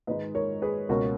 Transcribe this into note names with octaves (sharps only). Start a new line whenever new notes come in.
G#2 D#3 G#3 D#4 B4 D#5
A#4 C#5
G#4 B4
C#2 B2 A#3 C#4 F#4 A#4